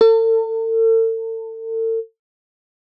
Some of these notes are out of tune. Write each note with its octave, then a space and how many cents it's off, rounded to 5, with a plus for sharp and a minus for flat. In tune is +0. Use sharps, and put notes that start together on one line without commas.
A4 +40